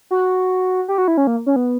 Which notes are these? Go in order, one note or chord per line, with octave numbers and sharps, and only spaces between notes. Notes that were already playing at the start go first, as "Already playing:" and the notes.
F#4
G4
F#4
E4
C#4
A#3
C#4
B3